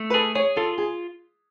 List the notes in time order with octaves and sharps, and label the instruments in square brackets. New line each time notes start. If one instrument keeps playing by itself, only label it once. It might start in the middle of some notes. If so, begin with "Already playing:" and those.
Already playing: [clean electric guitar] A3
[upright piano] B4
[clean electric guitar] G#4 [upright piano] A4
[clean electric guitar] G#4 [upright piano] C#5
[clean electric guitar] F4 [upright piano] A4
[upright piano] G#4